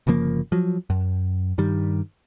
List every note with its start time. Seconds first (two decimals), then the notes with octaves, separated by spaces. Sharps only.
0.07 G1 C#3 F3 A#3
0.52 F3 F#3
0.90 F#2
1.58 G2 D#3 G3